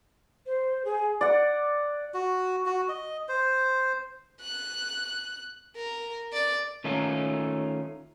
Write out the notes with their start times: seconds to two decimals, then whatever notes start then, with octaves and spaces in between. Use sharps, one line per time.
0.46 C5
0.85 G#4
1.21 D5 F#5
2.14 F#4
2.66 F#4
2.89 D#5
3.29 C5
4.41 F#6
5.76 A#4
6.33 D5
6.84 D#3 A3 C#4 D#4 F4 A4